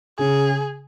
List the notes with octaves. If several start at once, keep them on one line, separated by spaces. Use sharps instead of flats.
C#3 G#4